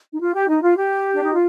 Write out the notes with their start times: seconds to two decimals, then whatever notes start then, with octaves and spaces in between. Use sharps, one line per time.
0.13 D#4
0.20 F4
0.34 G4
0.48 D#4
0.62 F4
0.77 G4
1.13 D4
1.23 D#4
1.33 F4